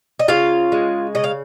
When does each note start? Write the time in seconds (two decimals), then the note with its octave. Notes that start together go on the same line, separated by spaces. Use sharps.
0.19 D#5
0.28 C#3 F4 F5
0.72 G#3
1.15 C#3 D#5
1.24 F5